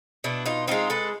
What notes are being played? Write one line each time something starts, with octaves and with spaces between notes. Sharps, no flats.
B2 D4 E4
D#4 F4
G#3 C4 D#4 F4
A4 B4